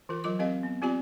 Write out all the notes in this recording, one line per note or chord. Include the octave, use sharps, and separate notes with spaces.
E3 F4 A#4
F#3 F4 A#4 D6
C4 G4 A#4 D#5 F5
B3
C4 F4 G4 D5 G#5